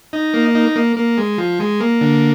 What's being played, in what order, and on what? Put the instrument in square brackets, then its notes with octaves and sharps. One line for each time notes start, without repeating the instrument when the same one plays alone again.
[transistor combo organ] D#4
A#3
D#4
A#3
A#3
G#3
F3
G#3
A#3
D3